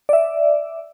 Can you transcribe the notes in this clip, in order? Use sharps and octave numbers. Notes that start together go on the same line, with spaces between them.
D5 E5